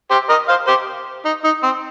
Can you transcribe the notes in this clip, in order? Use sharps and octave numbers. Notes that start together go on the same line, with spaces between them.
G4 C5
A#4 D#5
C5 F5
G4 C5
D#4
D#4
C4